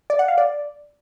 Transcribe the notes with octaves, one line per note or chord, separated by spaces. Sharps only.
D5
F#5
F5
D5